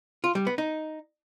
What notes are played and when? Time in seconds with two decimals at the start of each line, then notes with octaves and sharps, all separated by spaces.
0.24 F4
0.35 G3
0.47 B3
0.58 D#4